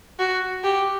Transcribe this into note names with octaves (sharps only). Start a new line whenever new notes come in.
F#4
G4